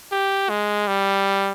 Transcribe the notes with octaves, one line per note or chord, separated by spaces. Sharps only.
G4
G#3
G3